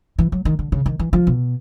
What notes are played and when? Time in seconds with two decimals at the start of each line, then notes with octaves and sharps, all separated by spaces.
0.19 E3
0.32 F#3
0.45 D#3
0.59 D3
0.72 C#3
0.86 D#3
0.99 E3
1.13 F3
1.27 B2